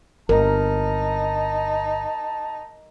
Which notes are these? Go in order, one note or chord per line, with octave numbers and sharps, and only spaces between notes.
G1 D#4 A#4 A5